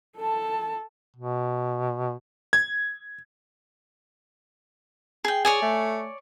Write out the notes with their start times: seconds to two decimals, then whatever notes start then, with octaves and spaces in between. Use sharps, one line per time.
0.18 A4 A5
1.16 B2
2.53 G#6
5.25 G#4 G5
5.45 G#4 C#5 D5 G#5
5.62 A3